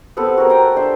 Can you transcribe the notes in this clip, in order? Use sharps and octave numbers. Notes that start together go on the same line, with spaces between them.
B3 C4 G4 A4
F#4 G#4 A#4 B4
G5 A#5
A4
D4 G4 C5 E5